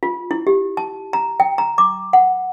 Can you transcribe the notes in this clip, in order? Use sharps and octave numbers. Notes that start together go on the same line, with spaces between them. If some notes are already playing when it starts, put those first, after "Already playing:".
F4
E4
G4
A5
A#5
G5
A#5
D6
F#5